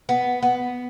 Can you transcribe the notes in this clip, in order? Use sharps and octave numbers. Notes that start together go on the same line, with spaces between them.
B3
B3